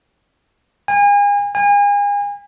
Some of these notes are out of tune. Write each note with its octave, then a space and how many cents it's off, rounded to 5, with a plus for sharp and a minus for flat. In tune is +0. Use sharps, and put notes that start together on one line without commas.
G#5 -35
G#5 -35